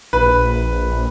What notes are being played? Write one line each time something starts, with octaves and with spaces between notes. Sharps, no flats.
A#1 B4